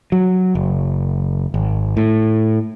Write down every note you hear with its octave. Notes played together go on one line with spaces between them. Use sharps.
F#3
F#1
G#1
A2